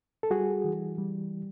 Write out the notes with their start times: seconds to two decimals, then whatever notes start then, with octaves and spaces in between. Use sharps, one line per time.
0.23 A4
0.30 G3 F#4 G#4
0.64 E3
0.98 G3